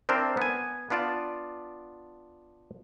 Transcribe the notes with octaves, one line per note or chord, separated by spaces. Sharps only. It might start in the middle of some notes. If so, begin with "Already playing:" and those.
C4 D4 E4 A#4 C5
B3 G#5
B3 D4 F4 D5 A5